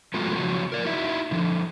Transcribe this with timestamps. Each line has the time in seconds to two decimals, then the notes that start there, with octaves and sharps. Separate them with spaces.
0.14 F3 G#3 A3 B3 F4 F#4
0.36 C#3 F3 F#3 F#4
0.72 A#4 D5
0.85 D#4 E4 F#4 E5
1.31 D3 F3